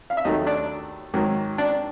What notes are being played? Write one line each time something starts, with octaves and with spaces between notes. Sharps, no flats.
F5
E5
D#2 D#3 F#3 A3 D#4 D#5
D4 D5
G#2 D#3 F#3
D4 D5